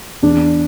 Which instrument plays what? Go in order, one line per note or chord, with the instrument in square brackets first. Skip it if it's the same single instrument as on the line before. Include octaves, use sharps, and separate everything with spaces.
[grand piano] E2 D4